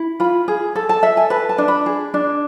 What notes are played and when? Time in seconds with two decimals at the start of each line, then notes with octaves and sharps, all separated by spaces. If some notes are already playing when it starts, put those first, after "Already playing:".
Already playing: E4
0.20 F4 B5
0.48 G#4
0.75 A4 A5
0.89 A5
1.03 A4 E5
1.17 G#5
1.30 B4 A5
1.49 A5
1.58 D4
1.68 B5
1.86 G#4
2.14 D4